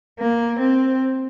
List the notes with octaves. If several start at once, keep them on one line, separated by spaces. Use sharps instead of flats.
A#3
C4